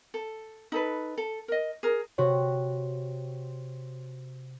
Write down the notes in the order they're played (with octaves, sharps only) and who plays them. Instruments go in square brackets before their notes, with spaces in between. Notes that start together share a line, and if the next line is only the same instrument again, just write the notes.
[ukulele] A4
D#4 A4 B4
A4
A#4 D#5
G#4 A#4
[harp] C3 F#4 [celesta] C#5